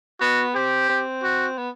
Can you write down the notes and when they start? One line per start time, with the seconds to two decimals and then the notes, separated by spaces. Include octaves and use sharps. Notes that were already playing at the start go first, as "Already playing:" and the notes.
0.21 B3 F#4
0.55 C4 G4
0.89 C4
1.23 F#4
1.58 B3